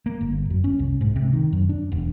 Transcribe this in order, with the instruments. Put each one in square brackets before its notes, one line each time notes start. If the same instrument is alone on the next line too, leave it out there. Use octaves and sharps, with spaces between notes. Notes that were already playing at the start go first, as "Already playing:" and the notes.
[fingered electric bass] A#3
G1
F#2
C#4
C2
G#2
C3
D#3
F#2
D4
E1